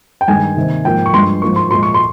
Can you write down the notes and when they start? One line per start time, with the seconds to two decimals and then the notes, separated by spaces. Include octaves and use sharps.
0.21 G5
0.28 G2 D#3 G#3 G#5
0.57 C3 D#3 A#3
0.85 G#2 F3 A#3 G5
1.06 C#6
1.13 G2 F3 G#3 C6
1.42 G#2 F3 A#3 C#6
1.56 C6
1.71 A#2 F3 G#3 C6
1.83 C#6
1.94 C6